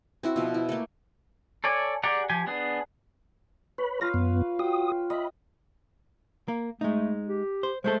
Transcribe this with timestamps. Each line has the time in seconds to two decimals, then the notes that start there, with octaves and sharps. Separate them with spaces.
0.23 C4 E4 F#4
0.36 B2 F3
0.54 E4
0.69 A3 A#3
1.64 A4 C#5 D5 G#5
2.03 G4 G#4 D5 F#5 A#5
2.30 F3 G4 G#5
2.47 B3 D4 G#4
3.78 B4 C#5 B5
4.01 F4 B4 F5 A#6
4.14 F#2 B3
4.59 F#4 G5 D#6
5.10 D#5 E5 B5
6.48 A#3
6.81 G#3 A3 D#4
7.27 G4
7.63 C5
7.84 G#3 A3 A4 C5